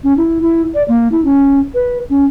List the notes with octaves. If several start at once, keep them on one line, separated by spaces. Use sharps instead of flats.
C#4
E4
E4
D5
A#3
E4
C#4
B4
C#4